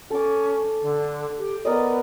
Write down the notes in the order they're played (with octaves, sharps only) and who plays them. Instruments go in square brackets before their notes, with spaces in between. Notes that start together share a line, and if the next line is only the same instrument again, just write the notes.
[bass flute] C#4 [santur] A4 D6
[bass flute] D3
G4
[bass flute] B3 [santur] A#4 D5 D#5